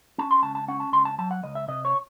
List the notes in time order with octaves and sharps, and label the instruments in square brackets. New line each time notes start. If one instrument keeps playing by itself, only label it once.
[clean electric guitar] C#4 A5
C6
C#2 A5
A5
C#4 F#5
A5
C#2 C6
A5
F#3 A5
F#5
C#2 D#5
E5
C3 D#5
C#5